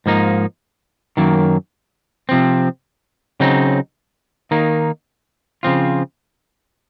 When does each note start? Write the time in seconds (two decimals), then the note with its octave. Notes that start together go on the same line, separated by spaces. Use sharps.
0.06 G#2 F3 A#3 D#4
1.17 F#2 D#3 F#3 A#3
2.29 C3 F3 C4
3.40 C#3 F#3 C4 D#4
4.51 D#3 A#3 D#4
5.63 C#3 F3 C4 F4